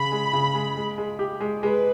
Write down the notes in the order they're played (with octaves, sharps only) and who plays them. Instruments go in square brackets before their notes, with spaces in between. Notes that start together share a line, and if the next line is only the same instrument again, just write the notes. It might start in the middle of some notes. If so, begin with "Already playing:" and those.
Already playing: [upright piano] C#3 [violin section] B5
[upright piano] G#3
C#3
G#3
G#3
G#3
G4
G#3
[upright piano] G#3 [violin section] B4